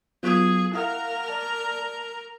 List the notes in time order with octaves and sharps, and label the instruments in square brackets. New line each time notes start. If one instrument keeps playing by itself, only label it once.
[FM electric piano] F#3 B3 F4 [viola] G#4
[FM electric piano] E4 F5 F#5 [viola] A#4
[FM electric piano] D5 A5